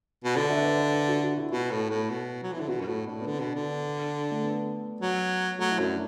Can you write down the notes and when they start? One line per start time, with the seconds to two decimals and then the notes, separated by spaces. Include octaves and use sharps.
0.24 B2
0.35 D3 F#4
0.50 E5
0.58 B4
0.65 D5
0.79 B4
0.94 B4
1.08 F#4
1.23 F#4
1.38 E4
1.52 B2 F#4
1.71 A2
1.90 A2
2.10 B2
2.43 F#3
2.52 E3
2.57 D3 E4
2.69 B2 F#4
2.81 F#2
2.87 A2 F#4
3.07 A2 D4
3.21 B3
3.26 D3
3.34 D4
3.40 B2
3.55 D3
4.31 A3
4.43 B3
5.01 F#3
5.59 F#3 A3
5.71 E4
5.78 F#2 D4